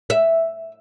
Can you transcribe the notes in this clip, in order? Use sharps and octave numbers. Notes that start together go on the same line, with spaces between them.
E5